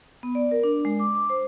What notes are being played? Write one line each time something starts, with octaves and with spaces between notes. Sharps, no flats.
B3
D5
A#4
D4
G#3
D6
D6
C5